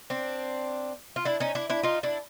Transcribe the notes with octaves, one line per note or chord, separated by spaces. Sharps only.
C4 D4
F4
D4 E4
C#4 D#4
D4 E4
D4 E4
D#4 F4
D4 E4